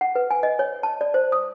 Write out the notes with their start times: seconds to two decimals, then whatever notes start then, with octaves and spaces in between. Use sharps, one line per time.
0.01 F#5
0.15 B4
0.31 G#5
0.43 D#5
0.59 C#5
0.83 A5
1.01 D5
1.14 C5
1.32 D#6